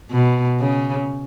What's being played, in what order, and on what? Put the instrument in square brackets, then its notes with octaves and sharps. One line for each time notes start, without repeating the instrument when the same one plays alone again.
[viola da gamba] B2
C#3